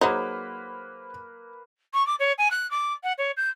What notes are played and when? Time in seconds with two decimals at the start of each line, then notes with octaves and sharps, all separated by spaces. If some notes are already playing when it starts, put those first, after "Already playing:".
0.01 F#3 A#3 D#4 G#4 B4 C5 F#5
1.94 C#6
2.07 D6
2.20 C#5
2.38 G#5
2.51 F#6
2.71 D6
3.04 F#5
3.18 C#5
3.37 G6